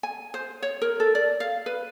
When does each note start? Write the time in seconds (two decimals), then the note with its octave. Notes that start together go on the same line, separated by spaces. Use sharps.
0.03 G#5
0.34 C5
0.62 C#5
0.82 A#4
1.00 A4
1.15 D5
1.40 F5
1.66 B4